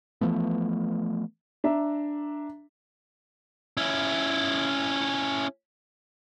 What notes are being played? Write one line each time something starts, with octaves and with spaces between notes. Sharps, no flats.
E3 F3 A3 B3
D4 E5 A#5
C#4 E4